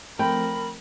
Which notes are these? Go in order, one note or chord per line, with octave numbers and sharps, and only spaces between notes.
F3 A3 C4 A#4 G5 B5